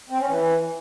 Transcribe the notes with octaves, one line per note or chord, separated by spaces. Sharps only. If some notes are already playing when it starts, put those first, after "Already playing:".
C4
C#4
E3